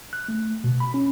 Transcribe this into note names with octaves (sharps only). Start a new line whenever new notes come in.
F#6
A3
B2
B5
C#4